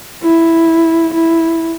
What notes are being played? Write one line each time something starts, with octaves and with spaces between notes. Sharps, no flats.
E4
E4